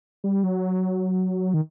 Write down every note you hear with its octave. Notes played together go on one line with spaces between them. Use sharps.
G3
F#3
D#3